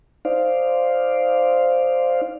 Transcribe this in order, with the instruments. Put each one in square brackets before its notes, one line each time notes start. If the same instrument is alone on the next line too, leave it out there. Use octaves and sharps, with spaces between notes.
[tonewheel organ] D#4 C5 D5 F5